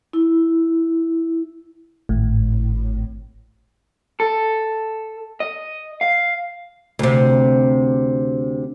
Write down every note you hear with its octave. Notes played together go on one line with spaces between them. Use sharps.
E4
G#1 A2
A4
D#5
F5
D2 C3